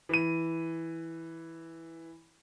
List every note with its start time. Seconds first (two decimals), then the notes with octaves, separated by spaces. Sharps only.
0.09 E3 D#7